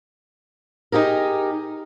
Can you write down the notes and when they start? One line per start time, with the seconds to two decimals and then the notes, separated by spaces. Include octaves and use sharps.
0.92 D#4 G4 G#4 A#4